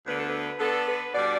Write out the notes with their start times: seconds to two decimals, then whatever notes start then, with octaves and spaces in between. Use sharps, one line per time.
0.06 D2 D3 B3 D4 B4
0.16 A4
0.25 B4
0.59 D3 B3 D4 A4
0.87 B4
1.13 B2 G3 D4 D5